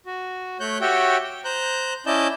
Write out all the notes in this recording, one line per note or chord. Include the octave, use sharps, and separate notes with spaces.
F#4
A3 C#5 F#6 G6
F#4 G4 C#5 E5 F#5 G5
G5
C5 A#5 F#6 G6
C#4 E4 D5 D#5 A5 G6